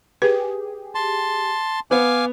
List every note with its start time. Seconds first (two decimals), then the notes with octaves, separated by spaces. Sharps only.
0.22 G4 G#4 B4
0.95 A5 C6
1.91 B3 F5 G#5 D6